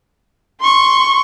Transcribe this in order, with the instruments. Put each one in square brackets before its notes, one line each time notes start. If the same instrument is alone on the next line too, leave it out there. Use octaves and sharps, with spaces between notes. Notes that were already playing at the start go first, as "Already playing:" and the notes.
[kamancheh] C6 C#6